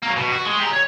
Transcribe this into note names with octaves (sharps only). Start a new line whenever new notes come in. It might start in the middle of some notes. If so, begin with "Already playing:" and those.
F#3 A#3
B2
F#4
G#3
G4 A#5
C#5